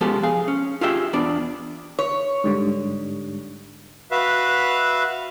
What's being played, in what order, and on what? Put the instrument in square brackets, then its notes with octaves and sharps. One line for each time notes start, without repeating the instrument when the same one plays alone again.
[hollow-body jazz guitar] F3 G#3 B3 C#4 G4 A4
G#4 F5
C#4
F4 G4 G#4 E5 G5
E2 B3 D4 D5
[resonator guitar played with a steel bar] C#5
[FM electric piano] G#2 D3 G3
[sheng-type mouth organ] F#4 B4 E5 F5